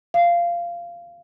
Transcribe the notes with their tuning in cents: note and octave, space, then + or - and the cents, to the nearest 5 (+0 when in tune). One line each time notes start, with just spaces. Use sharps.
F5 -15